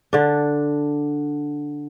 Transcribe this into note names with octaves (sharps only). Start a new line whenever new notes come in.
D3 D4